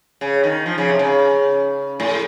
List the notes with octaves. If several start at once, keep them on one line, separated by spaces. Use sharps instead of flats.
C#3
D#3
F3
C#3
C3
C#3
A2